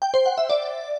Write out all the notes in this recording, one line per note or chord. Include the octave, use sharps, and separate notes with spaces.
G5
C5
F#5
E5
D5